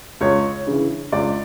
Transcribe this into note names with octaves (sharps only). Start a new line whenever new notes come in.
C#2 C#5
C#3 E3
C#2 D5